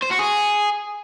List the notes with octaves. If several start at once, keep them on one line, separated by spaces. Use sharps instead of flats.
C5
F#4
G#4